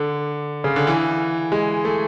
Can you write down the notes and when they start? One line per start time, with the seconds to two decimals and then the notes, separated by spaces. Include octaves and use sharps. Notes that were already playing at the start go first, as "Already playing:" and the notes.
Already playing: D3
0.64 C#3
0.76 D3
0.87 E3
1.52 G#3
1.85 A3